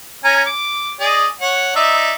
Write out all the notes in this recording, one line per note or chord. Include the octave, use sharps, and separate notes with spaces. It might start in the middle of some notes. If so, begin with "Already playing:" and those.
C#4 G#5 A#5
D6
G#4 D5 D#5
C#5 F#5
D#4 D5 E5